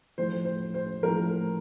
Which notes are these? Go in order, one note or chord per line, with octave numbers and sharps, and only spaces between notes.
A2 F3 C5
C5
C5
A2 F3 A#4